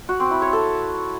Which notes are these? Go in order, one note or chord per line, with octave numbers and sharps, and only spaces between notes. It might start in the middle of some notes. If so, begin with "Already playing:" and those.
F#4
C4
E4
C#5
A4